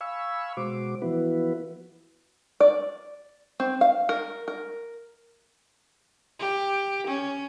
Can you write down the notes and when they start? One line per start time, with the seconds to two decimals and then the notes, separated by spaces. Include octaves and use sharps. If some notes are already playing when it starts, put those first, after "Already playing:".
0.01 F5 G#5 B5 C#6 E6
0.57 B2 G#3 F#4 C5 D6
1.02 E3 F3 B3 E4 F#4 B4
2.60 D5
3.60 C4
3.81 F5
4.09 A#4
4.48 A#4
6.39 G4
7.07 C#4